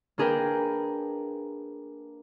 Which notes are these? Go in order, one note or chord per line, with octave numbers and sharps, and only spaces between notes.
A#3 D4 G#4 A#4 B4 G5